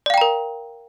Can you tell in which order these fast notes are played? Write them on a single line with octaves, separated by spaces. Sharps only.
D5 F5 G5 A#5 A#4